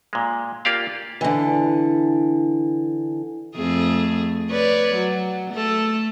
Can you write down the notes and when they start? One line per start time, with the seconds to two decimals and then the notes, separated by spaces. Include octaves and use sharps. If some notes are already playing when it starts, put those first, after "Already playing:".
0.13 A#2 G#3
0.65 A#3 F4 G4 D5 F5
1.21 D3 E3
3.56 F2 A3 G#4
4.51 B4 C#5 D5
4.95 F#3
5.54 A3 A4